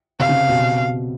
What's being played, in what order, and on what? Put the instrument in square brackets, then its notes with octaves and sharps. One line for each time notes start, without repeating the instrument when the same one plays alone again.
[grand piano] C3 [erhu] F5
[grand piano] C#3
B2